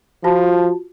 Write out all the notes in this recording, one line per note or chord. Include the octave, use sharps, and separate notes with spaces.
F3 F4 F#4 A5